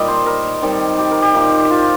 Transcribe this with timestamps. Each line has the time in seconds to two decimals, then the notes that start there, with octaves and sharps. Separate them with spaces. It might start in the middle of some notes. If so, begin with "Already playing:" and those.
Already playing: A#2 G3 D#4 D#5
0.08 C5
0.26 A#4
0.62 D#3 G3 C4
0.99 G4
1.11 A#4
1.22 G4
1.34 A#2 A#3 D#4
1.65 G4
1.71 F4